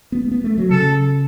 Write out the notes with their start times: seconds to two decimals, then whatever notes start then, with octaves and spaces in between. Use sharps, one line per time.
0.12 B3
0.26 A3
0.32 B3
0.44 A3
0.58 F#3
0.70 C#3 A4